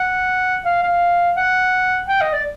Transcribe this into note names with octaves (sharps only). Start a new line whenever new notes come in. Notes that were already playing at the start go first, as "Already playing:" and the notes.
Already playing: F#5
F5
F5
F#5
G5
D#5
D5